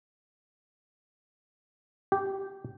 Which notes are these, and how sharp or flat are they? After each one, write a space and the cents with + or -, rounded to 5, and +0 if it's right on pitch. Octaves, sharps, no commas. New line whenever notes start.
G4 -10